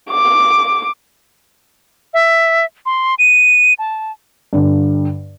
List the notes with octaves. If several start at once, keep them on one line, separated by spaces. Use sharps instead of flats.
D6
E5
C6
D#7
A5
G2 D3